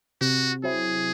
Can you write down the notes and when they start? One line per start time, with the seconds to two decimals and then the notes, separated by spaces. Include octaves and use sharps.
0.21 C3 F#4
0.64 F#3 C4 E4 G#4